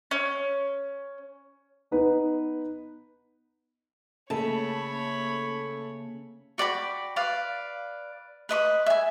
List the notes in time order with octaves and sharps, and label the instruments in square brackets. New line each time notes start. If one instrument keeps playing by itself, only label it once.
[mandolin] C#4
[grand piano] B3 D#4 B4
[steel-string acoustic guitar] C#3 [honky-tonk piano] A3 A5 [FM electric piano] A#3 C#4 [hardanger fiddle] C#5 B5
[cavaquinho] F#4 D5 G5 B5
B4 D5 F5
B4 D#5 B5 D6
E5 G#5